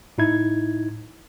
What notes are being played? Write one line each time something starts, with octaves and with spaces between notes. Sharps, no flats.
A2 D#4 E4 G#6